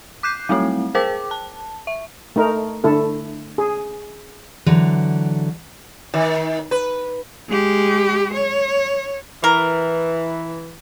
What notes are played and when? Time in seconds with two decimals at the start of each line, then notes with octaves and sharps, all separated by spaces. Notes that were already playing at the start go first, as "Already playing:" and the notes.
0.23 D6 F#6 G6 C7
0.49 F#3 G3 A3 C4 E4
0.95 G#4 A#4 C5 G5 D6
1.31 A5
1.87 E5
2.36 A3 D#4 A#4
2.84 D3 A3 E4 A4
3.58 G#4
4.66 D3 E3 F#3
6.14 D#3
6.71 B4
7.49 G#3 G4
8.33 C#5
9.44 E3 A#4